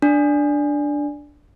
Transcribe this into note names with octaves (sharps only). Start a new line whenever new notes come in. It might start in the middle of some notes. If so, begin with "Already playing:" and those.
D4